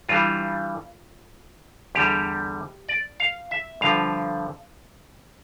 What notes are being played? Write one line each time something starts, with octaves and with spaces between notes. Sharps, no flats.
G2 E3 G3 F4
E2 D3 G3 G4
D5
F5
E5
G2 D3 F3 F5